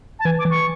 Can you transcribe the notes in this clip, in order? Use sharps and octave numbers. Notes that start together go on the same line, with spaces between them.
A5
E3 G#5
D6
E3
C#6